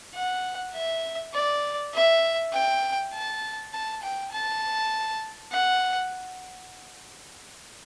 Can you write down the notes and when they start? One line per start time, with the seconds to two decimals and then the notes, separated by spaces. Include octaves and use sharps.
0.14 F#5
0.74 E5
1.34 D5
1.94 E5
2.53 G5
3.13 A5
3.73 A5
4.03 G5
4.32 A5
5.52 F#5